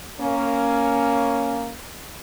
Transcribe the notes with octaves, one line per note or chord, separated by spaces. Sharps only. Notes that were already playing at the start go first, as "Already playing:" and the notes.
A#3 C#4